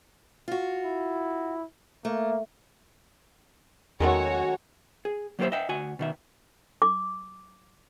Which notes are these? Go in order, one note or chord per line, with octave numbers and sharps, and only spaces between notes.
F4 F#4
E4
A3 A#3
E2 D#3 F#3 G#3 A3 C#4 F#4 C#5
G#4
F#3 A#3 G4 A4 C5 E5
D#5 E5 G5
D2 F#4 G#5
B2 D#3 E5
D6